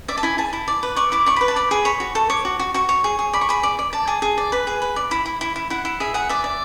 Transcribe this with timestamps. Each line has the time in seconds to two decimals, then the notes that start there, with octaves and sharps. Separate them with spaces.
0.08 D5 E5
0.17 A5
0.23 E4 G#5
0.38 G#4 A5
0.53 E4
0.68 D5
0.83 B4
0.96 D5 C#6
1.12 E4 D6
1.26 D5 C#6
1.36 B4 B5
1.48 A5
1.56 D5 B5
1.71 G#4 B5
1.85 C#5 B5
2.00 F#4
2.15 A4 C#6
2.30 C#5 D6
2.45 F#4
2.59 F#4
2.74 F#4 C#6
2.89 C#5
3.04 G#4
3.19 G#4
3.33 D5 B5
3.41 C#6
3.49 G#4 B5
3.63 D5
3.79 D5
3.93 D5 A5
4.07 G#4
4.22 G#4
4.38 D5
4.52 B4 B5
4.67 G#4
4.82 B4
4.96 D5
5.11 E4 B5
5.26 E4
5.41 E4
5.56 E4
5.70 E4 F#5
5.85 E4
6.00 G#4 E5
6.14 G#4 F#5
6.29 D5 E5
6.44 D5